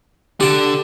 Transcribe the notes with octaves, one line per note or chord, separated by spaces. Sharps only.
D3 G4 A5